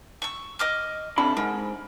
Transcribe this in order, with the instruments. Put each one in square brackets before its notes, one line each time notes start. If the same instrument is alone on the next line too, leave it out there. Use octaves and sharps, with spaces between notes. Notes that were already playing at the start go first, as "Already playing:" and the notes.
[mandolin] C#6 E6
D#5 D6 F6
[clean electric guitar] C3 D4 B5 [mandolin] A4
[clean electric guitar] G#2 [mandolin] A#4